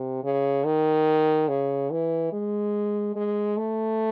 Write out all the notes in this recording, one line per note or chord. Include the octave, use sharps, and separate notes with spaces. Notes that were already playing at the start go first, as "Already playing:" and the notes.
Already playing: C3
C#3
D#3
C#3
E3
G#3
G#3
A3